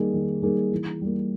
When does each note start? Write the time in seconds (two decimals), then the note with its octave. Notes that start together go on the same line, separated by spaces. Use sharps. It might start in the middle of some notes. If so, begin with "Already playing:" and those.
Already playing: D#3 G3 A#3 D#4 G#4
0.14 D#3
0.42 G3 A#3 D#4 G#4
0.72 E3
1.01 G3 A#3